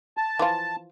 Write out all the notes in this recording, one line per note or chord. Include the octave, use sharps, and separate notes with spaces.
A5
E3 F3 F4